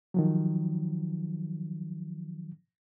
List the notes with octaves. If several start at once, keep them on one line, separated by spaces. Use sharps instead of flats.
D#3 F3 F#3